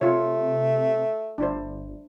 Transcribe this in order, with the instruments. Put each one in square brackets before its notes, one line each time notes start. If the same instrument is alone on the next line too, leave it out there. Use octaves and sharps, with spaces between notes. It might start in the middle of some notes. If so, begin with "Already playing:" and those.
[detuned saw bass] C3 [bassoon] A3 [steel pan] F4 C#5
[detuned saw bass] G1 [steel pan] D4 E4 C5